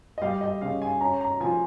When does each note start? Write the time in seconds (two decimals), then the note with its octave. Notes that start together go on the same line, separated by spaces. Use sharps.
0.18 D#5
0.22 G3 F5
0.41 D#5
0.61 C#3 F5
0.82 G#5
1.01 C#4 A#5
1.21 A#5
1.40 F3 G#5